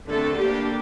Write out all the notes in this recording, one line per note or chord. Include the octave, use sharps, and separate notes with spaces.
D3 A3 C4 A4
G3 A#3 D4 G4